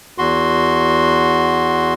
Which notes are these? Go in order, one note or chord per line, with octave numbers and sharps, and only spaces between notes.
E2 F#4 C6